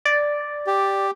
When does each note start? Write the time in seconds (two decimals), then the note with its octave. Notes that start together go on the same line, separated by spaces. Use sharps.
0.05 D5
0.67 G4